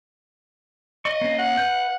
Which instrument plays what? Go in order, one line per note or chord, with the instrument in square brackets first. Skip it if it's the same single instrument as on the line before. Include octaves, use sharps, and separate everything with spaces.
[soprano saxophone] D#5 [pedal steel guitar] C#6
[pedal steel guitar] A#3 C#4
[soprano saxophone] F#5
[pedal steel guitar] B4 G6